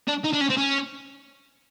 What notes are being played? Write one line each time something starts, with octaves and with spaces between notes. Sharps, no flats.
D4
D#4
D4
C#4
C4
C#4